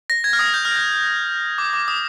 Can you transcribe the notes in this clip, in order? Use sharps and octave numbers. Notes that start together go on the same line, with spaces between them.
A#6
G#6
F6
D#6
G6
F6
G6
D6
D6
D#6